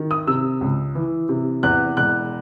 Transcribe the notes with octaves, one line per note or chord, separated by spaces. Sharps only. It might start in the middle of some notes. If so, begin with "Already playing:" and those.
Already playing: D#3
D#6
C3 E6
C#2
E3
C3
E2 F#6
E1 F#6